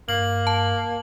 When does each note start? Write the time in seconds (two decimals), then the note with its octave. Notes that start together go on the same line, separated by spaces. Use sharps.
0.09 G2 A#3 F#7
0.47 A5